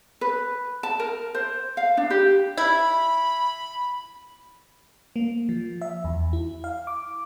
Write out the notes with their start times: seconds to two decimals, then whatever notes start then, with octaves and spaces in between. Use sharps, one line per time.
0.21 B4
0.83 A5
1.00 A#4
1.34 C5
1.77 F5
1.97 D4
2.10 G4
2.57 E4 B5
5.16 A#3
5.49 F3
5.81 E5
6.04 E2
6.33 E4
6.64 F5
6.87 D6